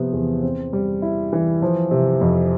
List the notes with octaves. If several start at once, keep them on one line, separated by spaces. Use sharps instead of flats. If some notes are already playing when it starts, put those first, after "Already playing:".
Already playing: C3 F3 B3
E2
C4
G3
E4
E3
F3
C3
F2